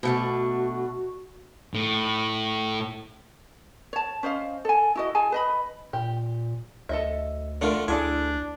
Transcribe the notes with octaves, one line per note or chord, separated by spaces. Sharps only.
B2 A3 D4 F#4
A2
C#5 A5
C#4 C5 D#5 F5
A4 G#5
E4 F#4 D#5
G#4 G#5 A5
B4 D#5 B5
A#2 G4
D2 A4 D#5 E5
D3 A3 D4 F4 A#4
D2 D4 E4 G#4 A4 G#5